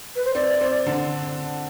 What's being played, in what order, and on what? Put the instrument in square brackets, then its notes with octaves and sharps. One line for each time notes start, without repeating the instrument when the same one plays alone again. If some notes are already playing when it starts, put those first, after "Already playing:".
[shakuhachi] B4
C5
[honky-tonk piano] C4 [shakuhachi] D5
[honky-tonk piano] C4
D3 D4